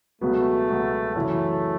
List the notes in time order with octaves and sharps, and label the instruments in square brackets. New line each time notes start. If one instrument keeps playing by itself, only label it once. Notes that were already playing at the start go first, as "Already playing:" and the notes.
[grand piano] C#2 B2 F#3 B3 F#4 [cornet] A3
[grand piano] C#2 B2 F#3 B3 F#4
[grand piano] F#2 C#3 E3 [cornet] A3